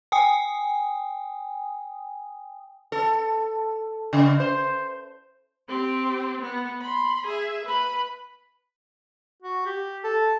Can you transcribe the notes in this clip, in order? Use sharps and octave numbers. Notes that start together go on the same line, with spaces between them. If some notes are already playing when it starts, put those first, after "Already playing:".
G5 G#5 D#6
A4
C#3
C5
C4 G4
B3
B5 C6
G#4 E5
B4 B5
F#4
G4
A4